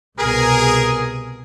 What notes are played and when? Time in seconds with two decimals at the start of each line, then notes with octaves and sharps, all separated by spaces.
0.19 C2 B2 G#4 A#4